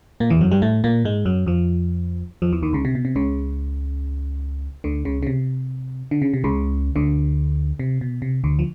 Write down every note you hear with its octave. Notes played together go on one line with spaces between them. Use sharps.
A#2 A#3
E2 E3
F#2 F#3
G2 G3
A2 A3
A#2 A#3
G#2 G#3
F#2 F#3
F2 F3
F2 F3
E2 E3
D#2 D#3
C#2 C#3
C3
B2
C3
C#2 C#3
D2 D3
C#2 C#3
C#3
C3
D3
C#3
C3
C#2 C#3
D2 D3
C3
B2
C3
D2 D3
F3